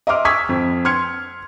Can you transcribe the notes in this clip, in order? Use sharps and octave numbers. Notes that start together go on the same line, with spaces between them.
D#5 E5 C6 D6 F6
C#6 D#6 E6 G#6 B6
F2
C6 F6 G#6 C#7